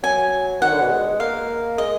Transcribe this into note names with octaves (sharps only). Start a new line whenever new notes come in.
F#3 G#5
D#3 F#5
D3
B2
G#3
A#3 F5
G#3 D#5